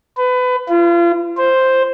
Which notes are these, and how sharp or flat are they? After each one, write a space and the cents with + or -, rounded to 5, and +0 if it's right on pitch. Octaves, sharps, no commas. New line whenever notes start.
B4 +25
F4 -35
C5 +5